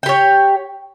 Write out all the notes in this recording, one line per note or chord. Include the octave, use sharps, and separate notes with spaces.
G4 C#5 G5